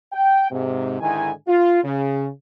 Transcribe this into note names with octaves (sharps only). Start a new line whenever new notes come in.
G5
G#2 C3
G#2 D3 D#3 E4 G#5
F4
C#3